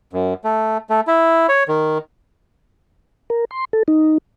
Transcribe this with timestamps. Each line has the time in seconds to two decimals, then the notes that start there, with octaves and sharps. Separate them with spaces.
0.13 F#2
0.44 A3
0.90 A3
1.07 E4
1.49 C#5
1.68 D#3
3.30 A#4
3.51 C6
3.73 A4
3.88 D#4